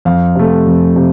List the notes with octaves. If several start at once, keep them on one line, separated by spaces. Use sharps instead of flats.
F2 F5
C3 A3
F2
C3